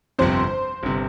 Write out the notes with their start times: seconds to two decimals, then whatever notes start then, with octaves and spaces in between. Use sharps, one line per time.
0.19 G1 F2 C3 C5
0.83 G1 C3